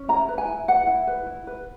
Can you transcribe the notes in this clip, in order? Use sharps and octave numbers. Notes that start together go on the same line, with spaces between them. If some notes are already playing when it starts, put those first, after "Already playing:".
Already playing: C#4
E4 A#5
B4
G#5
E4
B4 F#5
E4
B4
E4
B4